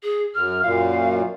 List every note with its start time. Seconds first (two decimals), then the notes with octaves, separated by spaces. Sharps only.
0.03 G#4
0.35 F#2 F6
0.63 F#2 A#2 F5